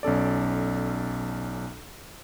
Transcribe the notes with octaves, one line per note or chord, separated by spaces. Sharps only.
B1 C#4 A4 D5